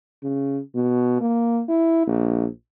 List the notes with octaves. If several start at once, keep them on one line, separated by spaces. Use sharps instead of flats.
C#3
B2
A#3
E4
A#1